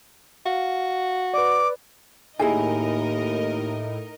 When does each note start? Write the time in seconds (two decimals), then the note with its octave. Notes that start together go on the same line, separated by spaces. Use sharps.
0.46 F#4 F5
1.34 B4 D5 D6
2.39 D#2 A2 D#4 E4 G#4 A#4 D#5 G#5